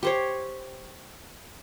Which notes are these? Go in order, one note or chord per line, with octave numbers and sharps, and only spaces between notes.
G4 C5 C#5